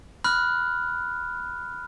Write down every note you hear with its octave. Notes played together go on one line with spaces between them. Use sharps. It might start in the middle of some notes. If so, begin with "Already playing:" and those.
B5 F6 F#6